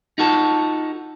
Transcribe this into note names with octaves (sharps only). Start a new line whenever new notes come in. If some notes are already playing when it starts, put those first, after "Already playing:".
D#4 F4 F#4 A4